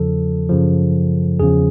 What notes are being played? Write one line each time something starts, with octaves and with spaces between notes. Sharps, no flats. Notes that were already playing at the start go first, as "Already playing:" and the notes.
Already playing: E2 C#3 F3 A4
F#2 C#3 F3
E2 C#3 F3 G#4